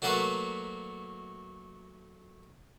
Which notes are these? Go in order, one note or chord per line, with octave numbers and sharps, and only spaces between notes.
F#3 A3 A#3 F#4 B4